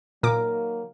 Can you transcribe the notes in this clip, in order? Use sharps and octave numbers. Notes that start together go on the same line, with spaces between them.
A#2 D#3 F#3 A#3 A#4 D6